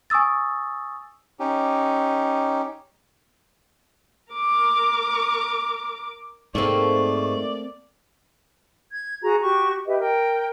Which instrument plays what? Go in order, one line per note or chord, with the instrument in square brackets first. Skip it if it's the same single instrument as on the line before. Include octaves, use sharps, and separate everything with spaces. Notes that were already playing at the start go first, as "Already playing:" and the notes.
[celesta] G#5 C#6 D#6 E6 A6
[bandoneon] C#4 D#4 G4
[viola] A#4 D6
[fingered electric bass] G#2 [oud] A3 A#3 C4 [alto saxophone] D5 [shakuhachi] C#6
[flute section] G#6
F#4 G#4 A#5
F#4 G4 C#6
G4 B4 D#5 E5
A#4 G5